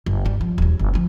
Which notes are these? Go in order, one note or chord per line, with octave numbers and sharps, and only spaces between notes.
F#1
G2 G3
F3
D#1 F#3
F#1
F3 C4